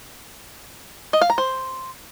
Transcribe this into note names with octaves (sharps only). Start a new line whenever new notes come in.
D#5
F5
A#5
C5